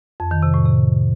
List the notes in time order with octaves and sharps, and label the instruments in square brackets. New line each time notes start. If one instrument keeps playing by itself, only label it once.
[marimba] F2
D#3
C3
A2
C3